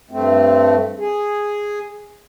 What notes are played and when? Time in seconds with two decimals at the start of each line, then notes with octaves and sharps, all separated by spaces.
0.11 G2 A3 C4
0.99 G#4